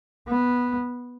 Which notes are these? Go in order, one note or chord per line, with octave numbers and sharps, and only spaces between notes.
B3